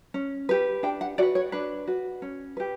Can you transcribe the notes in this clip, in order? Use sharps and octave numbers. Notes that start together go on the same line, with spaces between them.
C#4
G4 B4
D4 G5
F#5
F#4 B4 D5
C#5
D4 B4
F#4 B4
C#4
G4 B4